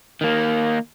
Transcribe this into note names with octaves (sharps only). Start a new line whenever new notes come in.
D#3 A#3